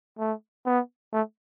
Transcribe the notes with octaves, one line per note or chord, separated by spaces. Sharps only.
A3
B3
A3